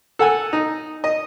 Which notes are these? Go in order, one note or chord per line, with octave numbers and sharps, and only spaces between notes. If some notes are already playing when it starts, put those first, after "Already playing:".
A4 F#5 G#5
D#4
D#5